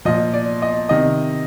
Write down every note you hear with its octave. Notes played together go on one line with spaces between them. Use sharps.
A#2 F3 D#5
D5
D#5
C3 D#3 D#5